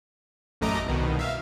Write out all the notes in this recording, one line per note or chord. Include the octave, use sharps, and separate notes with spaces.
A1 F#2 A3 D#5 A#5 D6
C2 B2 D#3
E5 F5